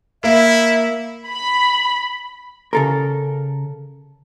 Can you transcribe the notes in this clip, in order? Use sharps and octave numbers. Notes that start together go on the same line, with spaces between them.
A#3 E4 E5
B5
C#3 A4 A#4